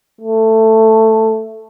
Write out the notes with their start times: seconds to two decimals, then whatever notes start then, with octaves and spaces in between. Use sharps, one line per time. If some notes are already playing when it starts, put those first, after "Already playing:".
0.21 A3